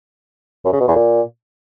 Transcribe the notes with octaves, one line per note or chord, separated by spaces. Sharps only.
F#2
C#3
B2
E2
A#2